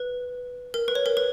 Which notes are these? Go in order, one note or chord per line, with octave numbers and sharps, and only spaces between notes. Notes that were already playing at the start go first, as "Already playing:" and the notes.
Already playing: B4
A#4
B4
C#5
A#4
B4